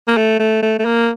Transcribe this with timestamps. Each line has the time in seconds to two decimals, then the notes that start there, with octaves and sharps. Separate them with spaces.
0.08 A#3
0.17 A3
0.39 A3
0.62 A3
0.79 A3
0.85 A#3